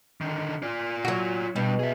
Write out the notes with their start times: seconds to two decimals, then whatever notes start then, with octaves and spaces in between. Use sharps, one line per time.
0.21 D3 D#3
0.63 F4 D5
1.05 F#3 F#4
1.56 B2 G3 D4
1.80 G#4 E5